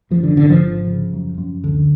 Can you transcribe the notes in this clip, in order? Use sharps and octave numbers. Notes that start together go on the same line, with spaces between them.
F#2 F3
D3
G#1 D3
F3
G#1
C#3
F#2
F#2
D2 D3